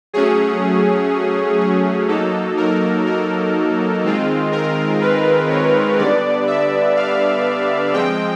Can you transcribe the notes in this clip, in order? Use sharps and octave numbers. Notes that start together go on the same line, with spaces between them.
F#3 A3 C#4 G#4
G#4
F#3 A#3 D#4 A4
A#4
A#4
D#3 G#3 C4 F4
A#4
B4
C#5
D3 G3 B3 D4 D5
E5
F5
F3 G#3 C4 G5